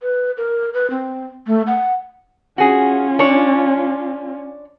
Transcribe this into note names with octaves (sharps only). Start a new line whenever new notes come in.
B4
A#4
B4
C4
A3
F#5
C#4 F4 F#4 G#4
D4 C#5